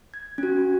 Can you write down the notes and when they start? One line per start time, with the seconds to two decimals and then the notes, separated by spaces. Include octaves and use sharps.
0.14 G#6
0.38 C#4 F#4 G#6